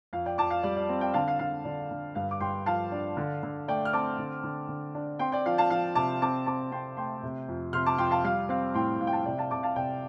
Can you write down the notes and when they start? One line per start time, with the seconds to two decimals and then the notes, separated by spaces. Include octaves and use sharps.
0.13 F2 F5
0.26 D5 G5
0.38 F2 A5 D6
0.50 F5
0.63 G3 D5
0.76 D5
0.89 C4
1.01 D5 G5
1.14 D3 F5 A5
1.28 F5
1.39 D3 F5
1.65 D3 D5
1.91 D3
2.15 G2 F5
2.31 D6
2.41 G2 G5 C6
2.66 F3 F5 A5
2.92 D4
3.17 D3
3.43 D3
3.68 A3 D5 G5
3.85 F6
3.93 C4 A5 D6
4.19 D3
4.44 D3
4.69 D3
4.95 D4
5.19 C4 G5 C6
5.32 D5 G5
5.46 F3 F5
5.58 F5 A5
5.70 F3 F5
5.95 C3 A5 D6
6.22 C4 A5 D6
6.46 C4 A5 D6
6.71 C4 G5 C6
6.97 A3 G5 C6
7.23 C3
7.48 F2
7.73 C3 C6 F6
7.86 A5 D6
7.98 F2 G5 C6
8.11 F5 A5
8.24 G3 F5
8.49 C4 F5
8.74 A2 G5 C6
9.00 A2 F5
9.07 G5
9.13 F5 A5
9.25 C3 D5 G5
9.38 F5 A5
9.51 C3 A5 D6
9.63 F5 A5
9.76 C3 D5 G5